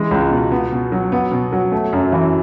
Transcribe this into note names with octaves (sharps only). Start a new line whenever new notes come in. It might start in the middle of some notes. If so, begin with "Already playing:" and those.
Already playing: E3 G#3
C#2
B2
B3
B2
F#3
B3
B2
F#3
A3
F#2
E3